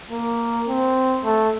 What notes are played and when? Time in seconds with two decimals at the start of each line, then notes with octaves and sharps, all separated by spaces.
0.11 A#3
0.68 C4
1.24 A3